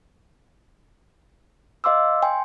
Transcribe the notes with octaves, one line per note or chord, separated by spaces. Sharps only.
D#5 F5 C6 D6 E6
G5 G#5 C6